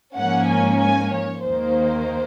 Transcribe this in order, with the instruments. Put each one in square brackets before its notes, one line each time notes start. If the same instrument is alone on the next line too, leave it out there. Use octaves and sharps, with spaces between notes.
[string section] G#2 F3 A#3 C#4 F#5
G#5
G#5
C#5
D#2 D#3 A#3 C5